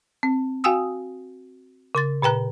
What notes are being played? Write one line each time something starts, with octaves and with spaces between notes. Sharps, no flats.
C4
F#4 F5 G5 G#5 D#6 E6
C#3 C6 A6
A#2 B4 G5 A#5 F#6